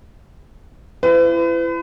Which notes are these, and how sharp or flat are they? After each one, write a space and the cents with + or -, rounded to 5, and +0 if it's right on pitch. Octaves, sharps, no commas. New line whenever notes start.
E4 +35 B4 +40